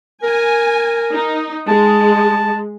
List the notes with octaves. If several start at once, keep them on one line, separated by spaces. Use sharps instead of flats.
A#4 G#5
D#4
G#3 A5